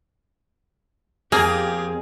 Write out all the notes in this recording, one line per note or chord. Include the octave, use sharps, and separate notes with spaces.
F2 A#3 G4 G#4 F5